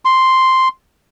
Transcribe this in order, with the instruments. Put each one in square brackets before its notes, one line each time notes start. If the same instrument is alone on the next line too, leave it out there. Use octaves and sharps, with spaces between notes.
[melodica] C6